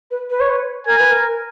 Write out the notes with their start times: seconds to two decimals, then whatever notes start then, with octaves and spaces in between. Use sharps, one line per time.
0.10 B4
0.30 B4
0.40 C#5
0.49 B4
0.86 A#4 G#5
0.98 B4
1.11 A#4